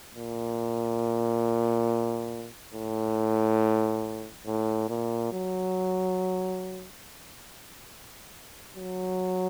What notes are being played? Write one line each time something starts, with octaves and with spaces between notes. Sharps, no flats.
A#2
A2
A2
A#2
F#3
F#3